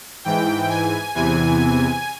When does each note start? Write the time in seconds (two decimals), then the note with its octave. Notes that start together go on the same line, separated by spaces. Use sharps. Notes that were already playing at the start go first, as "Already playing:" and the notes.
0.25 G#2 E3 G5
0.69 G#5
1.14 E2 C3 E3 G#5